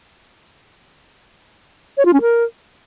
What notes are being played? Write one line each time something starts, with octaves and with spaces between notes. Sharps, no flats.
C#5
F4
C#4
A#4